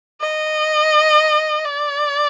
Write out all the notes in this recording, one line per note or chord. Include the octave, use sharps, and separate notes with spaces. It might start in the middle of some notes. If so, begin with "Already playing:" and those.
D#5
D5